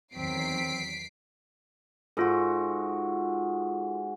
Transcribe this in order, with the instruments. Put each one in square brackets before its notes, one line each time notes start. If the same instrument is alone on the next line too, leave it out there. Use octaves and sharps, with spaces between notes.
[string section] E2 D#3 F#3 [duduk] C4 [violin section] B6 C7 D7
[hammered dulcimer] G#2 F#4 [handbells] F4 A4